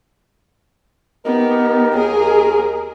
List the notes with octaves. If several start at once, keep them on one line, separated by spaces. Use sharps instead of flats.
B3 D#4 G4 A#4
D#2 G#4 A#4